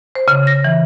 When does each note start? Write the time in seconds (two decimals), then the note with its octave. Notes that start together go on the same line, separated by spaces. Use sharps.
0.15 C5
0.28 C#3
0.47 A#6
0.64 E3